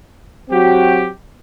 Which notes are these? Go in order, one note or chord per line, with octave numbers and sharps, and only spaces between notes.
F#3 C4 F#4 G4